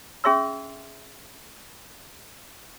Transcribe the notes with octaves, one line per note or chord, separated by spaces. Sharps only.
C#4 G#4 E5 C6 E6